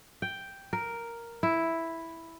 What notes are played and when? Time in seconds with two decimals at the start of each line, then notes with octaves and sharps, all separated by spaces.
0.22 G5
0.73 A#4
1.43 E4